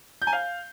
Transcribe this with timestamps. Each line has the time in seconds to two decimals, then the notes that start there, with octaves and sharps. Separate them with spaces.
0.22 G6
0.27 G#5
0.33 F5